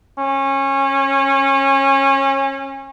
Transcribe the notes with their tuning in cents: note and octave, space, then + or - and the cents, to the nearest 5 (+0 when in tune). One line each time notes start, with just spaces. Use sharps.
C#4 -25